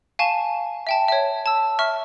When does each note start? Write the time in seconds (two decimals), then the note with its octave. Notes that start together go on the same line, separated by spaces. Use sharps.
0.19 F5 G#5 A5 C#6 E7
0.87 E5 G5 A5
1.08 C#5 E5
1.46 A5 E6
1.79 E5 C#6 F6